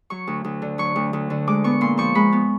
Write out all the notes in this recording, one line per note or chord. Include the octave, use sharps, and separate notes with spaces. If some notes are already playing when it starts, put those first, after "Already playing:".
F#3 C#6
D2
D2
D3
F#3 C#6
D2
D2
D3
G#3 D6
B3 C#6
A#2 C6
F3 C#6
G#3 B5
B3